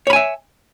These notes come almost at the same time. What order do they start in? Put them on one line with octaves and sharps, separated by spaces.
C#5 B5 G#5 E5